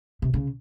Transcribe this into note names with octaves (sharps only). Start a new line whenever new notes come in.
C3
C#3